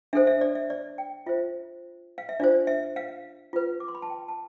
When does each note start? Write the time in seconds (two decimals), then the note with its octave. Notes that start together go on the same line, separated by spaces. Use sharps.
0.13 D4 A4 C5 E5
0.27 E5
0.41 D5
0.55 E5
0.70 D5
0.98 G5
1.26 F4 C5 E5
2.18 F5
2.29 E5
2.40 D4 F4 C5 D5
2.67 E5
2.96 F5
3.53 F4 B4
3.80 D6
3.88 C6
3.95 B5
4.02 A5
4.10 G5
4.28 A5